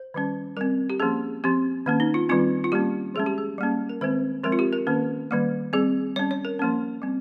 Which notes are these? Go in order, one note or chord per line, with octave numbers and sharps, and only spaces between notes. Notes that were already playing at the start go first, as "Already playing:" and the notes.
Already playing: C5
D#3 G3 C#4
G3 C4 A#4
G4
F3 A#3 C#4 G#4
F3 C4 G4
D#3 A#3 C#4
D#4
F4
D#3 G3 C4 F4
F4
G3 A#3 C#4 G4
F3 G#3 C#4 G#4
G4
G#4
G3 A#3 C#4
A#4
D#3 G#3 C4 C5
F3 G#3 C4 A#4
F4
G4
A#4
D#3 A#3 C#4
D#3 G3 A#3
G3 C4 G#4
G3 C#4 C#5
C#5
A#4
F3 A#3 C#4
G3 C4